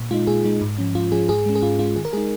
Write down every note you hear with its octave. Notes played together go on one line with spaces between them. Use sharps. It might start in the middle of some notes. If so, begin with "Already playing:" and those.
Already playing: A#2
G#3 D#4 F4
A#2 G#4
G#3 D#4
G#2
F3 C#4
G#2 F4
F3 C#4 G#4
G#2 G#4
G#3 C#4
G#4
G#2 F4
G#3 C#4 F4
D#3 G#4
A#4
G#3 D#4 G#4